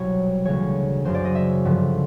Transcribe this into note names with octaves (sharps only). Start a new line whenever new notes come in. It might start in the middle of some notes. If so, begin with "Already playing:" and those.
Already playing: C2 B2 F#3 C#5
D2 C#3 E3 C#5
F#2 C#3 F#3 C5
D5
D#5
E5
G2 D3 F3